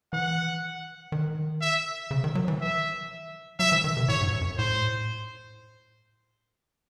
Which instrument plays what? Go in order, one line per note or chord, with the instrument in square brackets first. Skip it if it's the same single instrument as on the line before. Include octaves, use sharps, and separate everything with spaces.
[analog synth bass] E3 [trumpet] F#5
[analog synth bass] D#3
[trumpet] E5
[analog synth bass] C#3
D#3
F#3
E3
[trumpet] E5
[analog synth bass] F#3 [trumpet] E5
[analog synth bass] E3
D#3
C3
[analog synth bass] A2 [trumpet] C#5
[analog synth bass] G#2
F#2
F#2
[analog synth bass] A2 [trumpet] C5